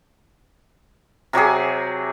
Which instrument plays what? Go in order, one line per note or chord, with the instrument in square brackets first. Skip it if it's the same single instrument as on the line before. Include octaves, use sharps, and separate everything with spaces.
[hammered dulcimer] C3 F#3 G4 G#4